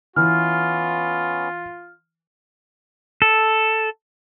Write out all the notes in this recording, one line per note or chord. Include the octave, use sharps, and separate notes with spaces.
E3 B3 C#4 F4 F6
A4